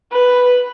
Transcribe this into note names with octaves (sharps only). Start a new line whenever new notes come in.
B4